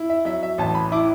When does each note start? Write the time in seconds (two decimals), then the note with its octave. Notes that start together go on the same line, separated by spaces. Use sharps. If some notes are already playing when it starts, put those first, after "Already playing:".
Already playing: E4
0.10 E5
0.25 F#3 E5
0.43 E5
0.58 A1 A5
0.75 B5
0.92 E4 D6